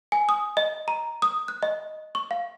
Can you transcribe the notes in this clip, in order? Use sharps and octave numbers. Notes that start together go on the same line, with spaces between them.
G#5
D#6
D#5
A#5
D#6
F#6
D#5
C#6
F5